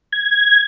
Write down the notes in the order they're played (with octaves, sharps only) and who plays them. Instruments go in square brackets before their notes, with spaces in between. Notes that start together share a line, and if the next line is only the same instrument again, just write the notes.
[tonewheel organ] G#6